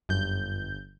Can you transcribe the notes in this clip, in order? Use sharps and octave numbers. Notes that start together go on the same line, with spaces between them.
G1 F#2 G6